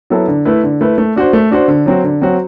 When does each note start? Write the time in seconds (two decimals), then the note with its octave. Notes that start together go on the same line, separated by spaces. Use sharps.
0.10 F#3 B3 E4 A4
0.28 D3
0.45 A3 E4 B4
0.63 D3
0.81 A3 E4 B4
0.98 A3
1.16 D4 F#4 C5
1.33 A3
1.51 D4 F#4 C5
1.68 D3
1.86 F#3 C4 F#4
2.04 D3
2.21 F#3 C4 F#4